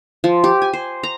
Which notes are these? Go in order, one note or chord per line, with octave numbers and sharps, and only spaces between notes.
F3
G4
G#5
C5
A#5